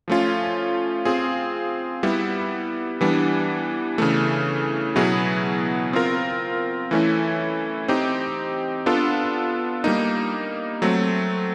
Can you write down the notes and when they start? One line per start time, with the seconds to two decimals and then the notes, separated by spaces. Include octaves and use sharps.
0.08 F3 A3 C#4 F4
1.05 C4 F4 G#4
2.03 G3 B3 E4
3.01 E3 G3 B3 D4
3.98 C#3 E3 A3
4.96 B2 F#3 B3 E4 G#4
5.93 C4 F4 A#4
6.91 E3 A3 C#4 E4
7.88 C4 D#4 G4
8.86 B3 D4 F4 A4
9.84 G3 A#3 D#4
10.82 F#3 A3 C4